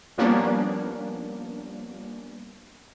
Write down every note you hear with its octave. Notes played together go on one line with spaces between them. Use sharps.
F3 G3 A#3 B3 C#4 D4